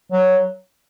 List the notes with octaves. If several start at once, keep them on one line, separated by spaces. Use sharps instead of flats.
F#3